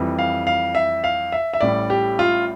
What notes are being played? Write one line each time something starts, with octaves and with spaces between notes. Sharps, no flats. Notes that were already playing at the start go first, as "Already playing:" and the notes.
Already playing: F2 E3 G3
F5
F5
E5
F5
E5
E5
A1 A2 G3 D5
G4
F4